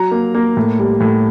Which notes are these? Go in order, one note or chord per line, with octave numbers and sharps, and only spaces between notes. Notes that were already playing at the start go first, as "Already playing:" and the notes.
Already playing: F#3 A#5
A#3
A#3
A2
G3
A2